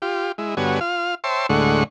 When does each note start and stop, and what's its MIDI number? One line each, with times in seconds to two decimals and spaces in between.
0.02 0.32 65
0.02 0.32 67
0.38 0.55 56
0.38 0.55 64
0.57 0.80 43
0.57 0.80 50
0.57 0.80 59
0.57 0.80 66
0.57 0.80 73
0.57 0.80 80
0.81 1.15 65
0.81 1.15 77
1.24 1.47 72
1.24 1.47 73
1.24 1.47 76
1.24 1.47 79
1.24 1.47 81
1.24 1.47 84
1.49 1.84 38
1.49 1.84 45
1.49 1.84 50
1.49 1.84 56
1.49 1.84 78
1.49 1.84 85